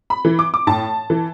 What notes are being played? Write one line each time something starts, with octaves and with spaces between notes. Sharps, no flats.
B5
E3
D6
D6
A2 A5
E3